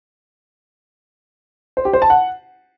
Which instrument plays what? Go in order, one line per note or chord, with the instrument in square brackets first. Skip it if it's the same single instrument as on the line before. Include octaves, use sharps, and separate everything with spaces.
[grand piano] C5
G4
C5
A5
F#5